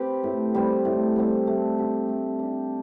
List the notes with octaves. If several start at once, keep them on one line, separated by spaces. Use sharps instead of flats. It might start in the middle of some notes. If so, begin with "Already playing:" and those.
Already playing: C4 G4 B4
A2
G3 C4 G4
A2
G3 C4 G4
A3
D4 G4
A3
D4 G4